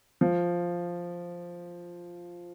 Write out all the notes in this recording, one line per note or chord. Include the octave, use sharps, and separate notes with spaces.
F3